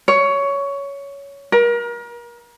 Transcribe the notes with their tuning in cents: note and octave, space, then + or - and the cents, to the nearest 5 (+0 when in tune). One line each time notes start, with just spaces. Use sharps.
C#5 +15
A#4 +35